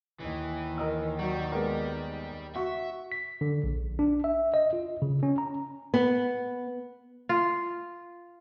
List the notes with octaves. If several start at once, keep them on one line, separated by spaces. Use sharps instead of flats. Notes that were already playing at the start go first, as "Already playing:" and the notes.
D#2 D#3 E3
A#4 D#5 E6
F#3 G3
G#3 B3 A#4
F#4 E5 C#6
B6
D3
A#1
D4
E5
D#5
F4
C#3
C#4
A#5
B3
F4